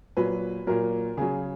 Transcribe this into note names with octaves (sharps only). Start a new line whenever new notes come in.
A#2 F#3 B4
A#2 F#3 A#4
C#3 F#3 G#4